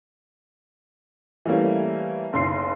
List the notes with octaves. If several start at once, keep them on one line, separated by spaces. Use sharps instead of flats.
E3 G3 A3 A#3 C#4
F#1 B1 C6 C7